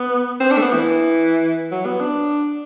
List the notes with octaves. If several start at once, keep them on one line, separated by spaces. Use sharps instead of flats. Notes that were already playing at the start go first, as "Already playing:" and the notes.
Already playing: B3
C4
D4
A3
B3
E3
F#3
B3
D4